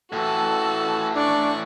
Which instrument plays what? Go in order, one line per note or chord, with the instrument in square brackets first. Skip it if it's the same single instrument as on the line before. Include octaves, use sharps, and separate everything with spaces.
[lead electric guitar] A2 E3 [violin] F#4 A5 [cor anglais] A4
[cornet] D4 [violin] D5 C#6